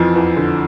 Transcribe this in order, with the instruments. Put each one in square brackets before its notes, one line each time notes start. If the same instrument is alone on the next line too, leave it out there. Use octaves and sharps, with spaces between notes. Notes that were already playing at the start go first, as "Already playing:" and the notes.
Already playing: [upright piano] F2 E3 F3
E2 E3
D3